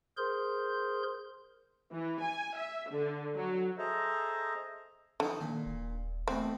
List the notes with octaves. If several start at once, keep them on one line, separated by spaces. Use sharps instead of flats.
G#4 A#4 C5 C6 G6
E3
G#5
E5
D3
F#3
G#4 A4 C5 D#5 E5 A#5
D3 E3 F3 D#4
A#2 D#3 G#5
D#1
B2 E3 A3 C4